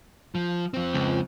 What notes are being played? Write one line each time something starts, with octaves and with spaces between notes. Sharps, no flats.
F3
F3 C4
C#2